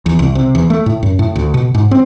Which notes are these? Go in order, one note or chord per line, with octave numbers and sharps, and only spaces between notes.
E2
C2
C3
E2
A3
A2
F#2
A2
D2
B2
G#2
C4